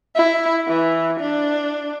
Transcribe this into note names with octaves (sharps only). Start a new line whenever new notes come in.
E4
E3
D4